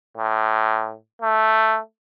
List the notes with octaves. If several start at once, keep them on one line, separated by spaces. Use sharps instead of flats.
A2
A3